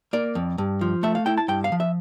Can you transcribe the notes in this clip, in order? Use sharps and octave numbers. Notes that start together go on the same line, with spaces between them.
A#3 D5
F2
G2
F3
A3 E5
F5
E4 G5
A5
G2 G5
F5
F3
E5